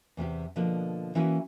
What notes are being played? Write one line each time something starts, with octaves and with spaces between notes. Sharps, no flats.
E2 C3 B3 G4
B2 D3 F3 A#3 B3 D4
E3 A#3 C#4 E4 F#4 B4